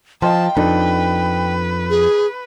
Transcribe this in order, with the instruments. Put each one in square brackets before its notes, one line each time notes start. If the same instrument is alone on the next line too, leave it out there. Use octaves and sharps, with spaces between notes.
[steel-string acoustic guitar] F3 [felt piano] D#5 F5 C6 [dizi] G5 [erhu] A5
[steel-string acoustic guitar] F2 [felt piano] D4 D#4 A4 [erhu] B4
[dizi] G#4